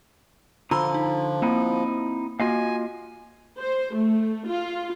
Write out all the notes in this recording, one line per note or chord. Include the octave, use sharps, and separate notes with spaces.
D3 F3 F4 A#5 B5 E6
D#4
A#3 C4 D#4 E4
A#3 F4 F#4 D#5 F5 G#5
C5
A3
F4